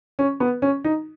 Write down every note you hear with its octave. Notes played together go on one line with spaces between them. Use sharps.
C#4
B3
C#4
D#4